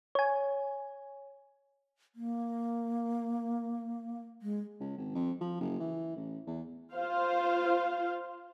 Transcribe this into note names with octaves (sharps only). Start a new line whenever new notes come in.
C#5 G#5
A#3
G#3
C#2
G#1
F2
F3
F#1
E3
A1
E2
F4 C5 F5